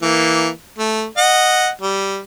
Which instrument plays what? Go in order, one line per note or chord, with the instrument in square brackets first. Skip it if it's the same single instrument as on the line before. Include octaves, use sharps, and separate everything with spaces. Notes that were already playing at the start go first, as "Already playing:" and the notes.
[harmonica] E3 A#3
A3
D#5 F#5
G3